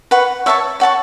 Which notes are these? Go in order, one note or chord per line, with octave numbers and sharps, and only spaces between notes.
B4 F#5 C#6
C#5 E5 A5 C#6
C#5 F#5 A5 C#6